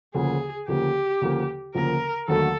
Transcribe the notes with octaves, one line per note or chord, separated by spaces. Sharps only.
D2 C#3 F3 A#3 G#4
D2 C#3 F3 A#3 G4
D2 C#3 F3 A#3
D2 C#3 F3 A#3 A#4
D#2 D3 F#3 A3 A4